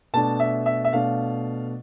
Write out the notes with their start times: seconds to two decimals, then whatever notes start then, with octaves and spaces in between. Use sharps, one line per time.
0.14 B2 A3 D4 A5
0.40 E5
0.66 E5
0.85 E5
0.93 B2 A3 D4 F5